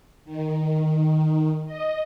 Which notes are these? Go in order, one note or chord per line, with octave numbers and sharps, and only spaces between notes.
D#3
D#5